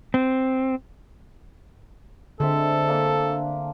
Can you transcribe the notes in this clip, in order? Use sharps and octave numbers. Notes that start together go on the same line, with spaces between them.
C4
D3 G#3 C4 A4 E5
A#3 D4 G#5